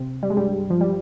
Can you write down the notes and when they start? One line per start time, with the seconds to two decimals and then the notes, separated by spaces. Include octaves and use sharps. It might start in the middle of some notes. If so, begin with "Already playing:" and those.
Already playing: C3 C4
0.23 G3
0.30 G#3
0.37 G2 G3
0.70 F3
0.81 G3